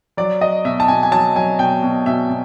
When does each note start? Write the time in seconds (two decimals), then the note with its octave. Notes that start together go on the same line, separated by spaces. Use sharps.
0.17 F#3 D5
0.41 F#3 D#5
0.64 B2 E5
0.80 A5
0.88 B2 G#5
1.03 G#5
1.11 F#3 A5
1.36 F#3 G#5
1.59 B2 G5
1.83 B2
2.06 B2 E5
2.29 B2